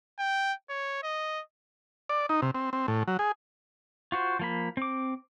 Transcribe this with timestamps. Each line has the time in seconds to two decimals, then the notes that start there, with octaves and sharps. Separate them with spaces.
0.19 G5
0.69 C#5
1.03 D#5
2.09 D5
2.29 D#4
2.42 C3
2.55 C4
2.73 C4
2.88 A2
3.08 F#3
3.19 G#4
4.12 F4 F#4 C5
4.39 F3 A#3 B5
4.77 C4 D6